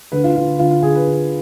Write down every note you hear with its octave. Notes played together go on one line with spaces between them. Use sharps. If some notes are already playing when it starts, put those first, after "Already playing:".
D2 B4
F4
D3 F4
D2 F4
F4
D3 G#4
B4
D3